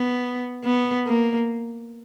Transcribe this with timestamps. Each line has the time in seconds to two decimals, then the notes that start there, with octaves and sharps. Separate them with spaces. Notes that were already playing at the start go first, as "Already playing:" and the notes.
Already playing: B3
0.64 B3
1.06 A#3